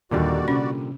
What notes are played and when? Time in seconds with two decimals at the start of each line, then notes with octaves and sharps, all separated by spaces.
0.11 D#2 A#2 D3 G3 F#4 D5
0.48 C3 C#4